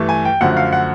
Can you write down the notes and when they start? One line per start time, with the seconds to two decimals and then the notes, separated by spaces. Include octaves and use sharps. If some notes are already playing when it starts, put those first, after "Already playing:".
Already playing: G2 E3 A3
0.09 G#5
0.25 G5
0.41 F#2 D3 F3 A3 F#5
0.57 F5
0.73 F#5